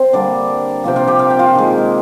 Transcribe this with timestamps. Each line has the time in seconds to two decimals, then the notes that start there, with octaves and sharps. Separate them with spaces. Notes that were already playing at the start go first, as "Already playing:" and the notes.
Already playing: C4 C5
0.13 D3 G3 A#3 D4 D5
0.84 C3 F3 A#3 G5
0.96 F4 F5
1.07 G4 G5
1.19 F5
1.30 G5
1.39 F4 F5
1.55 D#3 G#3